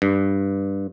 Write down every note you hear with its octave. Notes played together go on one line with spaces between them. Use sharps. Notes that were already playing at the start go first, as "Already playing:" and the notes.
G2